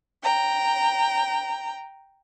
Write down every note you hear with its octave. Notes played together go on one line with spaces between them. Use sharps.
G5 A#5